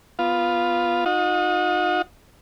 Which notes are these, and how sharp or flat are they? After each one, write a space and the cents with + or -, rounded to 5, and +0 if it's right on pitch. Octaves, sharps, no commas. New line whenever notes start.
B3 +0 F4 +0
D#4 +0 F#4 -45